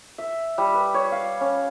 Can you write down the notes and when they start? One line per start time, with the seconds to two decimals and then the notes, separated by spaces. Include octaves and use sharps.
0.18 E5
0.58 G3
0.74 B4
0.94 C#5
1.12 F5
1.41 C#4